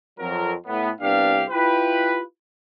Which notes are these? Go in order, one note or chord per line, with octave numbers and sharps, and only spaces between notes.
F2 F#3 A#4
A2 B3
C2 B3 D4 G4 F5
E4 F4 G4 B4